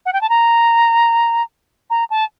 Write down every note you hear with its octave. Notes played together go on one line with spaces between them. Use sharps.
F#5
G5
A5
A#5
A#5
A5